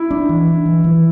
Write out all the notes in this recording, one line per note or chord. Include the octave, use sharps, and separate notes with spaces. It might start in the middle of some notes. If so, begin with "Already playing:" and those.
Already playing: E4
D4
E3
D4
E3
E3